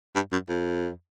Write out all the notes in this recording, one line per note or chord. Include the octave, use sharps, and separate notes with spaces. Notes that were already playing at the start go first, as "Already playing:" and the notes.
G2
F#2
F2